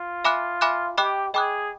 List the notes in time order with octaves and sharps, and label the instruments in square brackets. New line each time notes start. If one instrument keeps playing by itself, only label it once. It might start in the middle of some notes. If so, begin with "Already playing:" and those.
Already playing: [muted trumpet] F4
[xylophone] E5 G#5 B5 D6 F#6
E5 G#5 B5 D6 F#6
[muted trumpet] G4 [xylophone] D#5 G5 B5 D6 F#6
[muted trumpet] G#4 [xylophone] D#5 G5 B5 D6 F#6